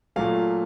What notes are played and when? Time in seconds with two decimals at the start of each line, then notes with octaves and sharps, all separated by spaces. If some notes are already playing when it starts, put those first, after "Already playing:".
0.16 A#2 F#3 A3 F5